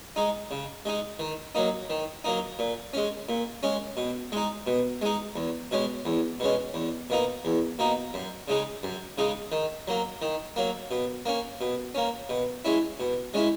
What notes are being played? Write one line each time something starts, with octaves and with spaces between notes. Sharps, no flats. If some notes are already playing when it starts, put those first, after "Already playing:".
G#3 D#4
C#3
G#3 D#4
D#3
F#3 A#3 D#4
D#3
F#3 A#3 D#4
A#2
G#3 C#4
A#2
G#3 C#4
B2
G#3 D#4
B2
G#3 D#4
E2
B2 G#3 C#4
E2
B2 G#3 C#4
E2
B2 A#3 D#4
E2
B2 A#3 D#4
F#2
C#3 G#3 D#4
F#2
C#3 G#3 D#4
D#3
F#3 A#3
D#3
F#3 A#3
B2
A#3 C#4
B2
A#3 C#4
B2
G#3 C#4 E4
B2
G#3 C#4 E4